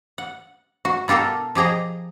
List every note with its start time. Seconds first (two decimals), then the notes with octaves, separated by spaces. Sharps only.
0.18 F#5
0.85 F#4
1.08 B2 F4 G4 A4 A#4
1.55 F3 G4 G#4 D#5 A#5